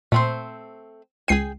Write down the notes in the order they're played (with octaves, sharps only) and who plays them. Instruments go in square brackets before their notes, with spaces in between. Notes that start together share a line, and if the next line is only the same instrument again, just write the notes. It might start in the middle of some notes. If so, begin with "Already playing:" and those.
[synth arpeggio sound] A#2 [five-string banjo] A3 C4 C5
[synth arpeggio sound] C#2 C7 D#7 [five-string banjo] G#4 G5 G#5